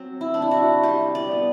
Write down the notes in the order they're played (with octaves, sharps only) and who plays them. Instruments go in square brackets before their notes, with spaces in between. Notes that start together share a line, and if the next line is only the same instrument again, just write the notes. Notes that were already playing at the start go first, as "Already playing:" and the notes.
Already playing: [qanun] F#3 C4
E4
C3 D4
E4
F#4
G3 G4
D5
B3